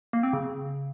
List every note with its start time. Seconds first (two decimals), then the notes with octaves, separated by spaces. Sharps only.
0.13 A#3
0.23 C4
0.33 C#3